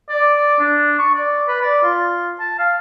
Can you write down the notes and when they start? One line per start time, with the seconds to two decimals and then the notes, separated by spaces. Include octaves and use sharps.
0.09 D5
0.59 D4
0.99 C#6
1.15 D5
1.48 B4
1.62 D5
1.83 F4
2.40 A5
2.59 F5